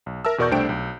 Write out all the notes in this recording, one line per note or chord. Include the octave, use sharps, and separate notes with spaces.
B1
A#4 E5 A5 E6
E2 B2 A#4 D5 C#6 G6
C2 A3 D4 C5 G5 D7
B1